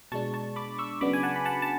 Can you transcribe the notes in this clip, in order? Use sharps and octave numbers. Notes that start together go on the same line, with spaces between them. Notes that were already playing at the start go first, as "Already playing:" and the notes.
B2 G#3 D4 A5 C#6
A5 C#6
B5 D6
C#6 E6
C#3 F#3 B3 D4 B5 D6
G#5
F#5 A5
B5
F#5 A5
A5